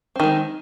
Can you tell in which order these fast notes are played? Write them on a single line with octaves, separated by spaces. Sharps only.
C4 D#3 G#3